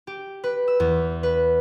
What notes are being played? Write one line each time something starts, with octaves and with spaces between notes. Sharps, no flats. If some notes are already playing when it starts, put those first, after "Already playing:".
G4
B4
E6
E2
B4